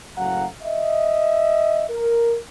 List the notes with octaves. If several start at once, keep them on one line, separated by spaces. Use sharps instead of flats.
F#1 A2 F#3 F5 F#5 A#5
D#5 E5
A#4